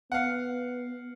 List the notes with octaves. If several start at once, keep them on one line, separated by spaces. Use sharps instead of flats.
B3 F5 F#5